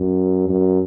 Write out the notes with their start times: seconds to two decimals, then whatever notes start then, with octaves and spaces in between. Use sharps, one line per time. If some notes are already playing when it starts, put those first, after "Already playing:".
Already playing: F#2
0.49 F#2